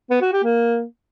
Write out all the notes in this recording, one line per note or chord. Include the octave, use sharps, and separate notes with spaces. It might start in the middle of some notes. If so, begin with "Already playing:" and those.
B3
F#4
G4
A#3